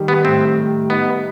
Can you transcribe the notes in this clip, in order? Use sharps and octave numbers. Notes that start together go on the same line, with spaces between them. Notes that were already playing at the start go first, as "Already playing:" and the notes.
Already playing: D#3 G3
B3
A2 C4
G3
B3 D#4